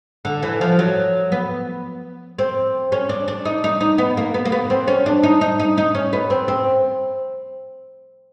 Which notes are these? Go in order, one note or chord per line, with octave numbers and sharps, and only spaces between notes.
D3
E3
F3
F#3
B3
C4
C#4
D4
D4
D#4
D#4
D#4
B3
A#3
B3
A#3
B3
C4
C#4
D4
D#4
D#4
D#4
D#4
C#4
B3
C4
C4